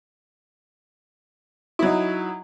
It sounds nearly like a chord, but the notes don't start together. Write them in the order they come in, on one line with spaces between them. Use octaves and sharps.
E4 F#3 D#4